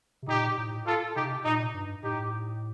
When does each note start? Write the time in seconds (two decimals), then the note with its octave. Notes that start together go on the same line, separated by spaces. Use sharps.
0.23 C3
0.28 A#2 D#4 G4
0.57 A2
0.86 F4 A4
1.16 C3 D#4 G4
1.45 A#2 D#4
1.74 G2
2.02 A2 D#4 G4